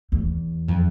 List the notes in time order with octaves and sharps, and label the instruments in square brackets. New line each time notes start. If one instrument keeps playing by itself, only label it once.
[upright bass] E2
[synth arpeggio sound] F2